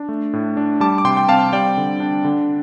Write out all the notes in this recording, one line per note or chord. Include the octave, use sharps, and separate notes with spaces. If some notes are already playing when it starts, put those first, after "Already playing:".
Already playing: D4
A3
A2
D4
G3 A5 D6
D6
C3 G5 C6
G5
C4 F5 A5
G3 D5 G5
D3
D4
D3